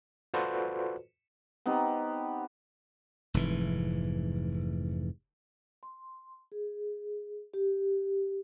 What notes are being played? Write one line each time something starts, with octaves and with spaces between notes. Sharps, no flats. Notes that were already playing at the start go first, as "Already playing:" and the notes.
F4 F#4 A4 B4 C5 D5
B3 C4 D#4 G4
F1 G#2 E3
C6
G#4
G4